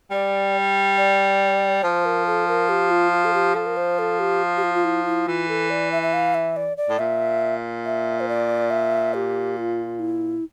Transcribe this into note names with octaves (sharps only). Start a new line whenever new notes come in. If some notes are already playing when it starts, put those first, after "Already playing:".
G3 D5
D5
F3 C5
A#4
A4
A#4
G4
F4
F4
A4
G4
F3 A4
A#4
C5
A4
G4
G4
F4
F4
E4
E4
E3 F4
A4
D5
E5
E5
F5
E5
D5
D5
A2
A#2 E5
E5
C5
D5
E5
G4
F4
E4